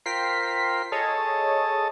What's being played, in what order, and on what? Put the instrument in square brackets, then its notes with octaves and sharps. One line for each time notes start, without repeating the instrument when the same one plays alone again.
[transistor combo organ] F4 A#4 C5 [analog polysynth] G5 B6 C7
[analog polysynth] G#4 C#5 D#5 [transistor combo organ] A4 A5 D#6